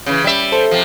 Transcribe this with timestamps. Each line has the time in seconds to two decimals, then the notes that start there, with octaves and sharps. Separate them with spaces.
0.06 C#3 E3
0.24 G3 E5
0.52 A4 C5
0.71 C3 F3